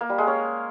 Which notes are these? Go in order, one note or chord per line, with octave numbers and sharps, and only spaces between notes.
A#3
G3
G#3
C#4